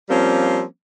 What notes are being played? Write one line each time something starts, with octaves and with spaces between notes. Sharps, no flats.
F3 G3 A#3 C4 C#4